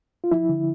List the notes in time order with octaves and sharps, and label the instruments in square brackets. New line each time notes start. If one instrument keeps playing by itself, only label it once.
[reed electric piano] F4
F3 E4
D3